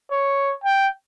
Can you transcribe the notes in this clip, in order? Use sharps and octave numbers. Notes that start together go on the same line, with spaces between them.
C#5
G5